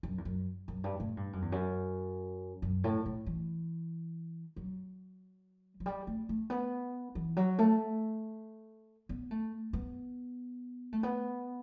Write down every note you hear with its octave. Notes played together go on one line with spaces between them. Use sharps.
F#2
E2
F#2
F#2
G2
A2
G2
F#2
E2
F#2
F#2
A2
A2
E3
F#3
F#3
G3
A3
A3
B3
E3
F#3
A3
B3
A3
B3
A3
B3